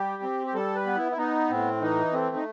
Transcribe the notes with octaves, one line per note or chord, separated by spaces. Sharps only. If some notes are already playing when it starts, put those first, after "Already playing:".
Already playing: G3 G4
C4
G4
G3 A4
B4
B3
E4
E4
B3 D#4
A2 C4
E3 D#4
A3 C4
D#4